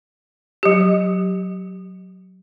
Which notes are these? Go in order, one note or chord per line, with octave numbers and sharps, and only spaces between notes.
F#3 G4